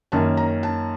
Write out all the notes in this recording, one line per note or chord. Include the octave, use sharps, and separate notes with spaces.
F#2 D#3 A#3 C#4 A5
A#5
A5